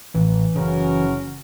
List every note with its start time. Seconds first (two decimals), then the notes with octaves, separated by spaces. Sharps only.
0.15 A1 E3
0.56 F#1 C#3 C#4 F#4 A#4